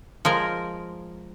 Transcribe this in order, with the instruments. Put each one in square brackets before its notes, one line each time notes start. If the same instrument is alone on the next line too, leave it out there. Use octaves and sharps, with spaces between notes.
[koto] F3 G#3 A#4